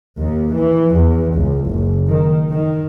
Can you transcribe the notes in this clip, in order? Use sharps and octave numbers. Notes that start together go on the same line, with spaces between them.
D#2
E3
E2
C#2
F#1
D#3
D#3